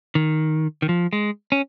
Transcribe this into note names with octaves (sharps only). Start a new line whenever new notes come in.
D#3
D#3
F3
G#3
C#4